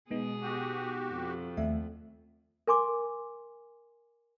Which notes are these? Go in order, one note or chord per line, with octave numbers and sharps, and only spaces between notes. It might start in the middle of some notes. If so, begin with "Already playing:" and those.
B2 G#3 B3 D#4 G#4
F#4 G4
F2
D#2 A3 E5
A#4 G#5 C6 D6